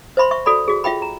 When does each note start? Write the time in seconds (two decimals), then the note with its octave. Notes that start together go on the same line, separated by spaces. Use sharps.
0.17 C5 E5 B5 C6
0.31 E5 C#6
0.46 F#4 A4 D5 B5
0.68 F#4 G#4
0.84 F4 E5 G5 B5
1.02 A#5